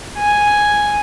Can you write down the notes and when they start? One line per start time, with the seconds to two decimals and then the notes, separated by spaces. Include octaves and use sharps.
0.18 G#5